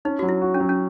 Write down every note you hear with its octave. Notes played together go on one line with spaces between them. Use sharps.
C#4 D#4
F#3 F#4
E4
F#4
C#4
F#3
C#4